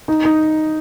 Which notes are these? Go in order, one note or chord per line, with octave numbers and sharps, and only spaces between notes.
D#4
D#4